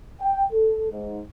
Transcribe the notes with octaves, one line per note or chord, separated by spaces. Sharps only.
G5
A4
G#2